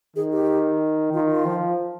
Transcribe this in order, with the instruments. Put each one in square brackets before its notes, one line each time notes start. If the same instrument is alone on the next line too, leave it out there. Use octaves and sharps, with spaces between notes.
[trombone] D#3 [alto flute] G#4
[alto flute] G4
[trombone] D#3 [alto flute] F4
[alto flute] F4
[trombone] F3